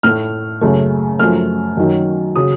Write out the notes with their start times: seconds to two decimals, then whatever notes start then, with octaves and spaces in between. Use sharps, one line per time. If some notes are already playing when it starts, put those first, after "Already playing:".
0.03 A2 A3 F6
0.61 F#2 C#3 A3
1.19 F#2 F3 A3 F6
1.77 F#2 D#3 F#3
2.35 C#3 F#3 D#6